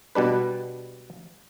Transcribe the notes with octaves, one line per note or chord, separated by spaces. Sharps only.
B2 G3 D4 B4